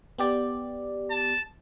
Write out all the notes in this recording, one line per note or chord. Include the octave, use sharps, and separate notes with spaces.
B3 G4 D5
A5